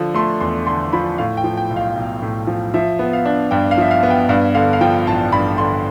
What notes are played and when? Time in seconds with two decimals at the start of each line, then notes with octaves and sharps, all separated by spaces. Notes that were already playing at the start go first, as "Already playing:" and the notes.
Already playing: D3 F3
0.14 A3 C6
0.40 E2 C6
0.67 D3 C6
0.93 F3 B5
1.18 A2 F5
1.37 G5
1.44 F3
1.57 G5
1.70 B1
1.76 F5
1.96 B1
2.22 A2
2.47 F3
2.74 F3 E5
2.99 B3
3.13 F5
3.25 D4
3.51 G2 G5
3.71 F5
3.78 F3 E5
3.91 F5
4.03 B3
4.10 G5
4.29 G2 F5
4.55 D3 F5
4.73 F5
4.81 F3 G5
5.07 A1 A5
5.32 G2 B5
5.58 D3 C6